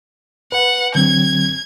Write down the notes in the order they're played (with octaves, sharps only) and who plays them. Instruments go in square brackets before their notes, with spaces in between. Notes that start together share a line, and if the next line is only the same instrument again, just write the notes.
[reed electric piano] B4 [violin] F#5
[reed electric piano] D3 F#3 C4 [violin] G#6